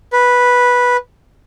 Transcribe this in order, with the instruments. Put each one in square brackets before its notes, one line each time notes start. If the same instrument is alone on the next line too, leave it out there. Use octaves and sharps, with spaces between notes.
[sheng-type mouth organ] B4